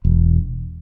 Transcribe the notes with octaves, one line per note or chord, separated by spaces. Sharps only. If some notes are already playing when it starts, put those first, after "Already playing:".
E1